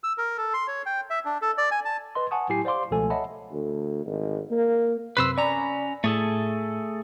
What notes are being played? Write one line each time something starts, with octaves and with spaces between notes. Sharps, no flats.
E6
A#4
A4
C6
C#5
G5
E5
D4
A4
D5
G#5
A5
B4 D#5 C6
F#5 G#5 A5 C#6 D#6
A2 F#3 E4 G4 G#5 C7
C5 D5 F5 C6 D6
C#2 B2 F3 A3 A4 G#5
C#5 D#5 E5 F#5 A5 B5
D2
G#1
A#3
F#2 C3 B4 C5 B5 E6
C#4 D5 A#5 B5
A2 A3 G#4 A4